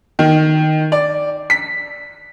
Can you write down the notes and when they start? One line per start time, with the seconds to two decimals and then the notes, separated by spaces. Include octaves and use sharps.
0.19 D#3
0.92 D5
1.50 B6